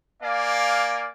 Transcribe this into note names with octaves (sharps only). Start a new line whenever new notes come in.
A#3 D5 F5 G#5